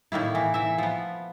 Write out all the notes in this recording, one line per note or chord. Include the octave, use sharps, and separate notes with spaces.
A2 D#3 A#3 E4
E3
E3 E5
F3 B3